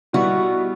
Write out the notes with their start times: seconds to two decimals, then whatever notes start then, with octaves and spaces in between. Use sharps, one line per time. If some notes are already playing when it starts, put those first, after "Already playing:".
0.13 B2 G3 B3 E4 F#4